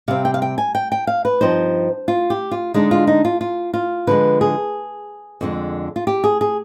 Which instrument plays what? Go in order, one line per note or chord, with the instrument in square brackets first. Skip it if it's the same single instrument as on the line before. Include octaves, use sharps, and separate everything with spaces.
[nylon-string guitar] C3 G3 C4 F5
G5
F5
G5
G#5
G5
G5
F5
B4
G2 F3 C4 D#4 C5
F4
G4
F4
D3 G#3 D4 D#4
F4
D#4
F4
F4
F4
D3 F3 G#3 B4
G#4
F2 D3 G#3
F4
G4
G#4
G#4